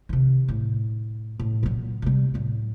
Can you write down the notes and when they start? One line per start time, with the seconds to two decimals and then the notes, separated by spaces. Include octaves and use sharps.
0.09 C3 D#3
0.48 A2
1.40 A2
1.63 A#2 F#3
2.02 C3 G3
2.34 A2 F#3